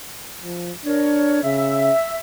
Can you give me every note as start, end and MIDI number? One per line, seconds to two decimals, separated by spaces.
0.43 0.72 53
0.86 1.41 62
0.86 1.39 70
0.86 1.39 73
1.44 1.91 49
1.44 2.17 76